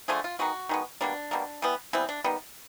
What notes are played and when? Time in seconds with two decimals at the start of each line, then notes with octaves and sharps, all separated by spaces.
0.08 D3 F3 A3 G#4
0.24 F4
0.39 D#3 G#3 B3 F#4
0.69 D#3 G#3 B3
1.01 B2 G3 A#3 D4
1.31 B2 G3 A#3
1.62 E3 G3 B3
1.93 E3 G3 B3 C4
2.09 D4
2.24 D#3 G3 B3